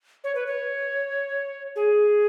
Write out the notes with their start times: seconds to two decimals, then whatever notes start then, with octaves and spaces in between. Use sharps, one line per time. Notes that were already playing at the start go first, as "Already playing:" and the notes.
0.24 C#5
0.35 B4
0.47 C#5
1.76 G#4